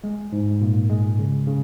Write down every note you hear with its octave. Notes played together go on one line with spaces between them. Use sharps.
G#3
G#2
A#2
G#3
C#3
C#3